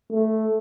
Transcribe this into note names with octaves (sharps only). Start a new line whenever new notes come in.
A3